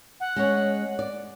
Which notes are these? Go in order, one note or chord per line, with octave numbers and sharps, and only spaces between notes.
F#5
G#3 C#4 C#5
D5